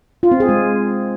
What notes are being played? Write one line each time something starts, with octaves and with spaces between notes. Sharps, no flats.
F4
C4
G#4
G#3